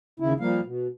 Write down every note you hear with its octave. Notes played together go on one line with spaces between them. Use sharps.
D#2 C#3 E4
F3 G3 A#3 F5
B2